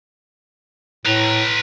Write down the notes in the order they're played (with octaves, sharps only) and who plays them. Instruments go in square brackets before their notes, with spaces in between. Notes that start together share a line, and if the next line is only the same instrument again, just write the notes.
[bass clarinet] A2 [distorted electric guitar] B4 A#5